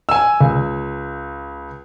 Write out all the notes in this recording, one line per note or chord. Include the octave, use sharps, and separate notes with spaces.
G#5 E6
C#2